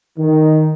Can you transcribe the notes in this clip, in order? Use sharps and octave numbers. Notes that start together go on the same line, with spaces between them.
D#3